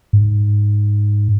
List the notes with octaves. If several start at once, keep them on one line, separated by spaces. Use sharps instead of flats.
G#2